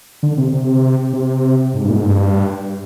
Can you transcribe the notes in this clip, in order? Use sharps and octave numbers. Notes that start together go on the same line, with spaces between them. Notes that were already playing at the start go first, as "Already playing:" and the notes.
D3
C3
C3
C3
G#2
G2
A#2
G#2
G2